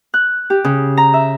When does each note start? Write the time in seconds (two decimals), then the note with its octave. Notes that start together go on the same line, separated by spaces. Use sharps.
0.14 F#6
0.50 G4
0.64 C#3
0.97 A#5
1.14 E5